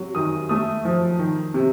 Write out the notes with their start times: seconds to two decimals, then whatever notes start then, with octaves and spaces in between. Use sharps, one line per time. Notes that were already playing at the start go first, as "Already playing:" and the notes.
Already playing: C3 F#3
0.15 D#3 D#6
0.49 A3 D#6
0.85 F3
1.19 D#3
1.54 C3